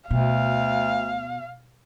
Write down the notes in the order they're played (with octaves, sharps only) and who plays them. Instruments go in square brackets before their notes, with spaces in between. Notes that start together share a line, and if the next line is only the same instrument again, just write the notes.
[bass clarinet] D2 [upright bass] B2 [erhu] F5